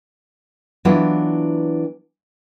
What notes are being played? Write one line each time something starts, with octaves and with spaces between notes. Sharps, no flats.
E3 F#3 B3 D4 E4 F4